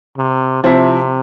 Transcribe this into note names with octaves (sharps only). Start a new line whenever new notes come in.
C3
C3 F3 C4 E4